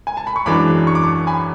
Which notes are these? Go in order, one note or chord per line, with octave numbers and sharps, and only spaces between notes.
G#5
A5
B5
C#6
F#2 E3 G#3 D4 B5 D6
C#6
D6
A5 C#6
G#5 B5